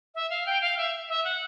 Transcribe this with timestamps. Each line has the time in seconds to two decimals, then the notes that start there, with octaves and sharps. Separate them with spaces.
0.15 E5
0.30 F5
0.46 G5
0.61 F5
0.77 E5
1.09 E5
1.25 F#5